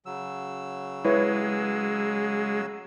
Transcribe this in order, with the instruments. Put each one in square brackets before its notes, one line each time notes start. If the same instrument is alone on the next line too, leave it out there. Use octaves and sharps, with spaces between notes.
[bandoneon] C#3 F#3 E6
[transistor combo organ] G#3 [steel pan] E4 B4 C#5